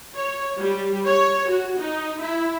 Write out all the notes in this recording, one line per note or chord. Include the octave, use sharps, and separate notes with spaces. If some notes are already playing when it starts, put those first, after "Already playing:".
C#5
G3
C#5
F#4
D#4
E4